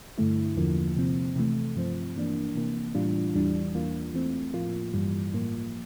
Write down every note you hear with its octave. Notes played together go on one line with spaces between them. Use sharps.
G2 D3 A3 E4
E2 D3 F3 A#3
C3 F3 C4
C3 E3 A3
G2 F3 C4
G2 E3 A#3 D4
C3 E3 A#3
A2 E3 G3 D4 F4
E2 E3 G3 D4
E2 E3 A#3 F4
E3 A3 C4
A2 F3 A#3 F4
G2 E3 G3
A2 F3 A#3